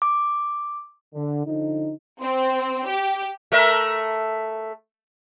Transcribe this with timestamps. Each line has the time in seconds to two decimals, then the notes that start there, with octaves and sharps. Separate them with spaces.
0.02 D6
1.14 D3
1.46 D3 F3 D#4
2.20 C4
2.86 G4
3.52 A3 A#4 E5